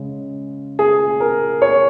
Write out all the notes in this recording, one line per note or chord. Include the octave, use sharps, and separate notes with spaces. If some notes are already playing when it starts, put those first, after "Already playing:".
Already playing: C#3 G#3
G#4
A#4
C#5